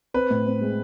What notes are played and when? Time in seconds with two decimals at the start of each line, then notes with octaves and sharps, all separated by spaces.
0.14 C4 B4
0.30 A2
0.46 C4
0.61 G#3